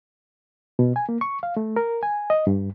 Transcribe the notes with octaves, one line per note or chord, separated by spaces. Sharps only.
B2
G#5
A#3
C#6
F5
A3
A#4
G#5
D#5
G2